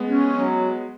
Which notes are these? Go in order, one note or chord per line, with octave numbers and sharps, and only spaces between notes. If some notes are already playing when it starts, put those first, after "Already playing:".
Already playing: G#3 B3
C#4
F#3